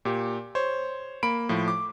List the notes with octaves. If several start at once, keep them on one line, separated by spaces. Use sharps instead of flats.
A#2 G4
C5 C#5
A#3 B5 D7
A2 F3
D6